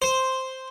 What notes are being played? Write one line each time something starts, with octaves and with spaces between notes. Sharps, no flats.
C5